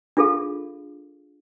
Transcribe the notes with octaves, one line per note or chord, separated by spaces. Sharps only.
D4 F4 G#4 A4 F5